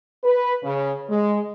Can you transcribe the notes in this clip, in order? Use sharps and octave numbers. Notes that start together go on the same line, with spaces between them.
B4
C#3
G#3